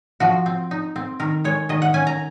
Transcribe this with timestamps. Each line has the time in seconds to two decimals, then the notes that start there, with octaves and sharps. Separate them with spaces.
0.20 F3 F#4
0.46 C4
0.71 D#4
0.96 C4
1.20 D#3 A#4
1.44 G#3 C#5
1.69 D#3 D#5
1.82 F#5
1.94 C#4 G#5
2.07 A#5